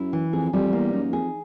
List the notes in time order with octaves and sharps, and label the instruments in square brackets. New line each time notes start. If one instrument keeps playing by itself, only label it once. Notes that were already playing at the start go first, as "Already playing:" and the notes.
Already playing: [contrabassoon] F#2 [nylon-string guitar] E4
[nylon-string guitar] E3
[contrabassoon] F2 [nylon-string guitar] G#4
[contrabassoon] F2 [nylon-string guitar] G3
[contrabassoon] E2 [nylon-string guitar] A#3
[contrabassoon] F#2 [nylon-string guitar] D#4
[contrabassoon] F2 [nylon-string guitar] G#4